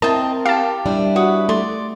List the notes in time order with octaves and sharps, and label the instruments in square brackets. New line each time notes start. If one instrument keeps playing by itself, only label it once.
[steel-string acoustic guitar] C4 [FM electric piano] E4 A#4 [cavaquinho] D#5 G5 [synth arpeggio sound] A5
[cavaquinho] G4 [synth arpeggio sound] F5 A5
[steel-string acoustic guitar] G3 D4 E4
[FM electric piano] F#4 [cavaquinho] B4 C#5 D#6
[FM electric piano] A3 [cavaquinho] D5 C6